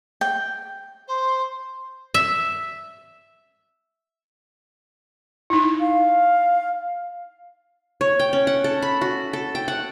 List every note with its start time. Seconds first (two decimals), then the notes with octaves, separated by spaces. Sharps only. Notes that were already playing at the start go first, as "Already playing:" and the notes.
0.21 G5
1.07 C5
2.14 E5
5.50 D#4 E4
5.80 F5
8.01 C#5
8.20 G5
8.33 C#4
8.47 F#5
8.64 A4
8.82 B5
9.01 F#4
9.33 A4
9.55 G5
9.68 F#5